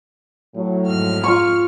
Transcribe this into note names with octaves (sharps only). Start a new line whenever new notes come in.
A2 F#3
F2 G#2 F6
F4 C#6